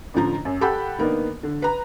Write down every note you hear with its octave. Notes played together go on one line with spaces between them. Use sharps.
A1 D3 F3 A#5
F#2
G4 A4 F#5 G5 B5
D#3 A#3 B3 D4 D#4
D3
B4 A#5